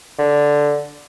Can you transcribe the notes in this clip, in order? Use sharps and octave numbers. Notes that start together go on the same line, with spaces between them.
D3